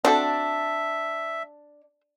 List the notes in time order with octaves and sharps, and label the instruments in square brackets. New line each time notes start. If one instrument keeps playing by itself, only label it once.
[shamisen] C4 F#4 A4 [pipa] D4 [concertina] E5